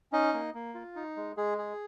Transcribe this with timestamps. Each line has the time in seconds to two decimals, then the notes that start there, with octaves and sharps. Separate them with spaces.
0.12 C#4 D#4 D#5
0.33 A#3
0.54 A#3
0.75 F4
0.96 D#4
1.16 G#3
1.37 G#3 G#4
1.58 G#4